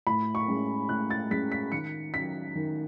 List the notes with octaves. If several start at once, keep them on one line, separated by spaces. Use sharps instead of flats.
A2 B5
C#6
G#3 C#4
A2 F#6
A6
G#3 C#4 B6
B6
D#3 C#7
F#3 C#4 B6
D#3